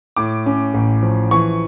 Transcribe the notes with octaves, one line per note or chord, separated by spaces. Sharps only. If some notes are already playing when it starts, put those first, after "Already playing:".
A2 D6
C#4
A1
F3
E3 C#6